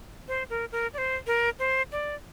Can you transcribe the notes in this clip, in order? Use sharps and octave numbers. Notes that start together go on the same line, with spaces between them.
C5
A#4
A#4
D5
C5
A#4
C5
D5